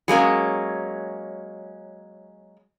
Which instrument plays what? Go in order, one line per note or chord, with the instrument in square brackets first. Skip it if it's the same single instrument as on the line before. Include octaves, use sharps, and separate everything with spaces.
[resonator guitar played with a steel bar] F#3 G#3 A#3 C#4